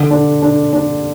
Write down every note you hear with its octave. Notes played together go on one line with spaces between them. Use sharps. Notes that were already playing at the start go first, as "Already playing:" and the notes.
Already playing: D3
D4
D4
D4